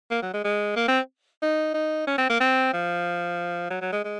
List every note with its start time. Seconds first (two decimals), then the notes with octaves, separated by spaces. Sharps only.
0.10 A#3
0.22 F#3
0.33 G#3
0.44 G#3
0.76 A#3
0.88 C4
1.42 D#4
1.74 D#4
2.07 C#4
2.18 C4
2.29 A#3
2.40 C4
2.73 F3
3.70 F#3
3.81 F#3
3.92 G#3
4.04 G#3